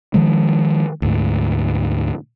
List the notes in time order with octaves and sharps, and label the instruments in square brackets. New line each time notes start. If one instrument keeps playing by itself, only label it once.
[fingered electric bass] D#3 F3 G#3
D2 G#2